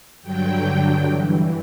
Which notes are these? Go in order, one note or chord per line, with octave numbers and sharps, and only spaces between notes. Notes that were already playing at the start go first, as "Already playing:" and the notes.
G2 D3 F#3 G5
G2 E3